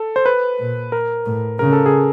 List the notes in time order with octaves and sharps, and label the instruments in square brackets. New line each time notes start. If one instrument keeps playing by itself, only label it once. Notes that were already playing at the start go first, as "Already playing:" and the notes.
Already playing: [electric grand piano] A4
C5
B4
[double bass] A#2
[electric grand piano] A#4
[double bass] A2
[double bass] C#3 [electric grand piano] A#4
[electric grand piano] A4
G#4